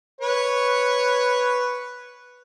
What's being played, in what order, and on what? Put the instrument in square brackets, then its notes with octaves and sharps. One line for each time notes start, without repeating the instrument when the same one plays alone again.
[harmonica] B4 C#5